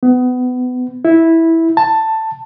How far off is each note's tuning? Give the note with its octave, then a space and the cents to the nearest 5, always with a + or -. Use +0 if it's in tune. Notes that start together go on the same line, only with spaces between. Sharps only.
B3 +25
E4 -10
A5 +10